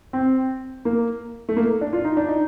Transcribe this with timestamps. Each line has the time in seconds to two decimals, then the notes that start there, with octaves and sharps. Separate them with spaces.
0.13 C4
0.85 A#3
1.49 A3
1.57 A#3
1.81 D4
1.93 F4
2.05 D#4
2.17 D4
2.29 D#4